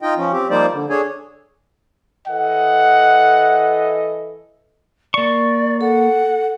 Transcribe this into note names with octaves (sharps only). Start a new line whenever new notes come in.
D#4 F4 D#5 G5
F3 C#4
C4 G4
F3 G3 A#3 D#4 C5 D5
D3
D4 G#4 A4 C#5 G#5
E3 A4 D#5 F#5
A#3 D5 C#6
A4 F#5